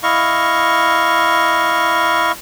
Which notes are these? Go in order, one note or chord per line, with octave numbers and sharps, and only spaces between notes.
E4 D#5 F5 C#6